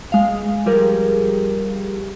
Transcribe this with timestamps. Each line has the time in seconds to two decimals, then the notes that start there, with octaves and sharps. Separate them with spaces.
0.12 G#3 F5
0.66 F3 G3 G4 G#4 A#4